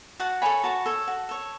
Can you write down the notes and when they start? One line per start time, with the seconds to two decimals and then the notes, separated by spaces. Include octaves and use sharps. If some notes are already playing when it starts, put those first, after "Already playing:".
0.20 F#4 F#5 A5
0.42 A4 C#5 G#5 B5
0.64 F#4 A5 C#6
0.86 A4 C#5
1.07 F#4
1.29 A4 C#5